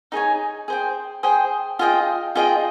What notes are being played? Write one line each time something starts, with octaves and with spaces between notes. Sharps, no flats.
D#4 G#4 C#5 G#5
G#4 C5 G5
G#4 C5 G5
F4 G#4 D#5 G5
F4 G#4 D#5 G5